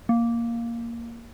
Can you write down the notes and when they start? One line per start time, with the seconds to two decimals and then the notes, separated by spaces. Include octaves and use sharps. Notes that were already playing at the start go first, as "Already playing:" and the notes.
0.09 A#3